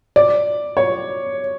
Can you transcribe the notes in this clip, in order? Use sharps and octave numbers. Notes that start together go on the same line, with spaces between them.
D5
C#5